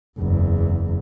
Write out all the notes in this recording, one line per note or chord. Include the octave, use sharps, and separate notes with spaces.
F#1 E2